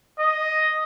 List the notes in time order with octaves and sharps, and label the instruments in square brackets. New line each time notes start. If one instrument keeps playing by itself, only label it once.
[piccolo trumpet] D#5